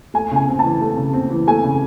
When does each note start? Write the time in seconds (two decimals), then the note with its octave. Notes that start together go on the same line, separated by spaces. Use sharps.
0.14 A3 G#5
0.31 C#3 G#5
0.48 C4
0.59 E3 A5
0.81 A3
0.97 C#3
1.13 C4
1.30 E3
1.47 A3 G#5
1.64 C#3